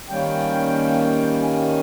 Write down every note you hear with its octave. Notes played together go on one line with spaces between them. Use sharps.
D#3 G3 A#3 C#4 G5
G#5